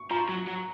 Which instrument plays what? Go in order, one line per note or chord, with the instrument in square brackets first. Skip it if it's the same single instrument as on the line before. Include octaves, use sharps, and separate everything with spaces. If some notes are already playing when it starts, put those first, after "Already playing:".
Already playing: [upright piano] C#6
[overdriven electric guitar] F3 [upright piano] A#5
[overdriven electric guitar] F#3
F#3